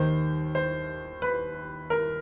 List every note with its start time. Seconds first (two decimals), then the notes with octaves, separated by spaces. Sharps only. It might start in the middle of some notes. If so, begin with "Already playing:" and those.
Already playing: D#2 D#3 C5
0.55 C5
1.22 B4
1.90 A#4